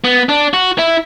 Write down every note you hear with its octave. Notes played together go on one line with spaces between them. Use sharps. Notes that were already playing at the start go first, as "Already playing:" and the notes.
B3
D4
F#4
E4